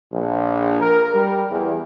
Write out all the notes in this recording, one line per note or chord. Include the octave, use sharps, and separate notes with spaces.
A#1
A#4
G3
E2